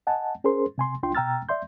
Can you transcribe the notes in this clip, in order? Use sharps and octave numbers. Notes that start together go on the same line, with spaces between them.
D#5 F#5 G#5 A5
C#4 G#4 A#4 C5 C6
C3 G#5 C6
C2 D4 F4 G5 C6
B2 G5 A#5 E6 F6 A6
D5 E5 C6 G6